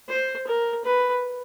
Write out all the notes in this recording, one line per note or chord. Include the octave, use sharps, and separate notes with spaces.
C5
A#4
B4